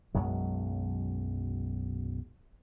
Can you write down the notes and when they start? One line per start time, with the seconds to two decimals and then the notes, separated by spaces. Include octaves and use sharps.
0.15 B1 F#2 F#3 G#3